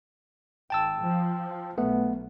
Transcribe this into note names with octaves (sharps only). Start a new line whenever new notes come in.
G#1 G5 A5 E6
F3
B1 A3 B3